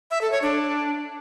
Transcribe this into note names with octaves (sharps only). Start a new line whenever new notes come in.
E5
A4
C#5
D4